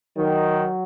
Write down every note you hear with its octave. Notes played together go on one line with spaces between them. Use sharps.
D#3 F#3